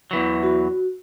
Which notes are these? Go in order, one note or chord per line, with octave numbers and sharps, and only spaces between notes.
E2 E3 F#3
F#4